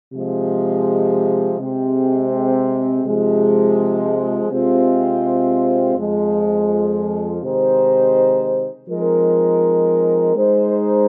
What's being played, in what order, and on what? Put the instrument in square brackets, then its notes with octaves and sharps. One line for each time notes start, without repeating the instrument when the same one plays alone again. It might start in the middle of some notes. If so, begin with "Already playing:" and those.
[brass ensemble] C3 F3 G#3
C3 G#3 C4
C3 F3 G#3
C3 G#3 C4 F4
F2 F3 G#3
C3 D#3 G#3 D#4 C5
F3 G#3 C4 D#4 A#4
G#3 D#4 C5